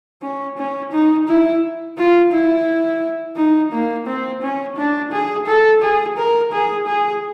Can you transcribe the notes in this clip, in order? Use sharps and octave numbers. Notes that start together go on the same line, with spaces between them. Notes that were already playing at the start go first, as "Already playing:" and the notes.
C#4
C#4
D#4
E4
F4
E4
D#4
A#3
C4
C#4
D4
G#4
A4
G#4
A#4
G#4
G#4